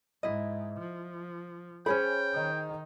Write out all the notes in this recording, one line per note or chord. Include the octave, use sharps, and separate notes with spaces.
G#2 E4 D#5
F3
C#4 G#4 C5 C#5 G5 B5
D#3 D#4